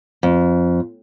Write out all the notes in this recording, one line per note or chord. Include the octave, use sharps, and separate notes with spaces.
F2